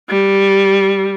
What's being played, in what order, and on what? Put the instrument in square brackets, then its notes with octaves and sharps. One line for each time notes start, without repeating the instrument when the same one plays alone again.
[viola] G3